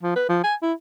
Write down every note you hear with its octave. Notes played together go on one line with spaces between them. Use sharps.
F3
B4
F3
G#5
E4